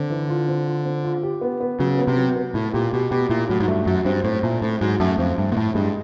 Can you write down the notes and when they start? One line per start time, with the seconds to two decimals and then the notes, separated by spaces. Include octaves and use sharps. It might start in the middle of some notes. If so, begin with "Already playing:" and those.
Already playing: D3 C4
0.10 E3
0.29 F4
0.48 C4
0.66 F4
0.85 C4
1.04 F4
1.23 G4
1.41 B3
1.61 B3
1.79 C#3 F#3
1.98 B3
2.08 C3
2.17 F#3
2.36 B3
2.54 A2 E4
2.74 A#2 G4
2.92 B2 G4
3.11 B2 G4
3.30 A#2 E4
3.49 A2 F#3
3.60 G#2
3.68 G2 A3
3.86 F#2 F#3
4.05 G2 C4
4.24 A2 C4
4.43 A#2 A3
4.62 A2 C4
4.81 G#2 F#3
5.00 F#2 A3
5.18 F2 C4
5.38 G2 A3
5.52 A#2
5.57 A2 A3
5.75 G2 G#3